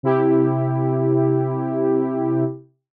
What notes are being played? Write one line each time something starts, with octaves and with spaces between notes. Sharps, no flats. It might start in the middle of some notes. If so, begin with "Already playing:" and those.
C3 E4 G4